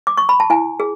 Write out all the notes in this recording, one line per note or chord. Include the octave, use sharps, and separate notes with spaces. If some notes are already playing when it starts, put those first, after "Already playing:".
D6
C#6
B5
A5
E4 G#5
G#4